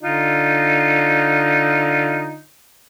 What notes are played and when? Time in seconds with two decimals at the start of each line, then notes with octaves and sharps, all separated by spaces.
0.03 D3 D#4 F4